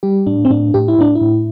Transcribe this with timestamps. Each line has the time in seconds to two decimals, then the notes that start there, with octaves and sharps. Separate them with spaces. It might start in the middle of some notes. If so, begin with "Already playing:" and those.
0.03 G3 G4
0.27 A2 D4
0.45 C4
0.50 A2 D4
0.74 A2 G4
0.88 E4
0.98 A2 D4
1.15 E4
1.21 A2